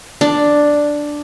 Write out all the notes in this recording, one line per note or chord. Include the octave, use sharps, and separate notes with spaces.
D4